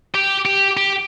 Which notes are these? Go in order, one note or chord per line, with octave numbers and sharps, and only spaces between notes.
G4
G4
G4